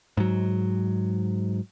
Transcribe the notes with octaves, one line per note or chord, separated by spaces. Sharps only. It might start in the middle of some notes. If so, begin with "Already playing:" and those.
G#2 F#3